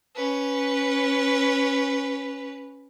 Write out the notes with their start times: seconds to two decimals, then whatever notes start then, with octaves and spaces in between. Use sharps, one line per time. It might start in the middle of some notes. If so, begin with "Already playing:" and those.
0.16 C#4 B4